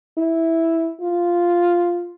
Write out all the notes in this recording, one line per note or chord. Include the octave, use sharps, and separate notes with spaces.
E4
F4